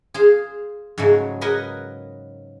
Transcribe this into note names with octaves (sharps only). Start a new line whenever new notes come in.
G#4 C5 F5
G#2 C#3 F#3 G#3 A3
A#4 B4 D#5 F#5 G#5